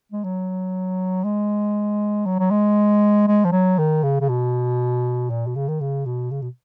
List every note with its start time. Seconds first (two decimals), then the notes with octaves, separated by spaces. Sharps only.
0.12 G#3
0.24 F#3
1.24 G#3
2.26 F#3
2.39 F#3
2.51 G#3
3.28 G#3
3.45 F3
3.52 F#3
3.79 D#3
4.03 C#3
4.20 C#3
4.29 B2
5.30 A#2
5.47 B2
5.56 C#3
5.68 D#3
5.81 C#3
6.06 B2
6.31 C#3
6.42 B2